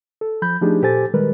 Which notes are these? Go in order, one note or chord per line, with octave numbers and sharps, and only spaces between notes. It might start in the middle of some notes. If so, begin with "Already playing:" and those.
A4
F3 B5 G6
F3 A3 D4 D#4 G4 G#4
A#2 G4 A4 C5 G#5 A6
D#3 G3 G#3 A#4 B4